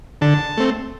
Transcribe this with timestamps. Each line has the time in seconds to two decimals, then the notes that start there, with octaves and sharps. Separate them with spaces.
0.21 D3 A5
0.58 A3 C4